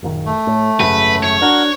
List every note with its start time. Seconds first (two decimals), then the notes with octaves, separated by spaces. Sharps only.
0.03 F#1 A#2 D#3
0.26 A3
0.47 A2
0.80 G#1 F#2 C#3 B4
1.23 C#5
1.42 D4 F#4 A#4 F#5